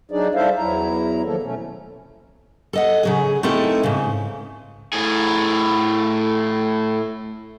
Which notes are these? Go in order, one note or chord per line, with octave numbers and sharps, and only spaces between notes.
F#3 D4 D#4 G#4 D5
G3 E4 A4 C5 E5 F5
E2 F#3 E4 A#5
D#3 F3 F#3 A#3 A4
B2 A3 C#4
A4 D#5 F#5
C#3 F#3 G#4
A3 C4 D#4 E4 A4 A#4
G#2 C#3
A2 G#4